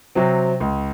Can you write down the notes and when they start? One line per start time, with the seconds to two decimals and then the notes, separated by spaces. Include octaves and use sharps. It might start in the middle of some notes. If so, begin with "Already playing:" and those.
0.15 C3 F#3 C4
0.60 C#2